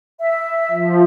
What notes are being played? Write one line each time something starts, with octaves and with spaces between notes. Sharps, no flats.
E5
F3